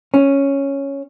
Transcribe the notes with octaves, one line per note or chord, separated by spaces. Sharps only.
C#4